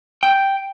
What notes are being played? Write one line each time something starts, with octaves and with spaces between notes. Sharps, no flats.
G5